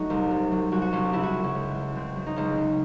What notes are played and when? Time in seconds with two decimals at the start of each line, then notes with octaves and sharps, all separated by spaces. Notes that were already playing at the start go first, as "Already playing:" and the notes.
Already playing: F#3 A3 D#4 F#4
0.10 C2
0.31 C3
0.51 F#3
0.72 C2 F#4
0.82 F#4
0.92 C2 C#4
1.13 C#3 E4
1.23 F#4
1.34 F#3
1.44 C#4
1.55 C#2
1.75 C#2
1.95 C#3 C4
2.16 F#3
2.26 D#4
2.36 C#2 C#4
2.58 C#2